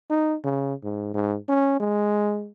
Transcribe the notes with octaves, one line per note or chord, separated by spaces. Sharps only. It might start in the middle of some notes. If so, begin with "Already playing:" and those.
D#4
C#3
G#2
G#2
C#4
G#3